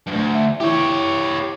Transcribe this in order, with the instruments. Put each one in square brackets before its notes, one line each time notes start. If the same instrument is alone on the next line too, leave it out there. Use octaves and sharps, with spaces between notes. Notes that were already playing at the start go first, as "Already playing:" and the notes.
[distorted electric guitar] D2 G2
[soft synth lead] E5
[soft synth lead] E4 [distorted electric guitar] G4 C#5